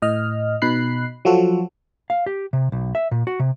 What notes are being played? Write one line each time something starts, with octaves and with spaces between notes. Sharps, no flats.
A2 D#5 F6
B2 D#4 B5 F#6 C7
F3 F#3 F4 F#4 A4
F5
G4
C3
B1
E5
A#2
F#4
C3